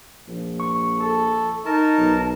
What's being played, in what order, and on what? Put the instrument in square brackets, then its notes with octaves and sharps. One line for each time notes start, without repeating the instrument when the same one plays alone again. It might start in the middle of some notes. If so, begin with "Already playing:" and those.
[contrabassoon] A#1
[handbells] C#6
[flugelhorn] A4
[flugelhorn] D#4 [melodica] A#4 A5
[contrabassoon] B1